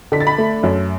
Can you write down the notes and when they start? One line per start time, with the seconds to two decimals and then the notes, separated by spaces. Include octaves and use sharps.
0.12 D3 B6
0.20 A6
0.27 B5 B6
0.38 A3
0.63 F#2